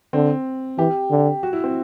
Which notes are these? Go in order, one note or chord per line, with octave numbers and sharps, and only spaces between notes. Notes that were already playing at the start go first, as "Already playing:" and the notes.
D3 C4
E3 G4
D3
F#4
E4
C4